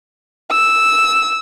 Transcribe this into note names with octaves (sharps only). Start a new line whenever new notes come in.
E6